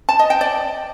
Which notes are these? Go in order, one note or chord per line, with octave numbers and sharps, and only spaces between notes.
A5
D#5
G5
D5